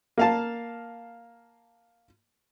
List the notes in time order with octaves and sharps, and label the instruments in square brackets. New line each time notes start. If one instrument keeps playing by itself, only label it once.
[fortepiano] A#3 F5 A5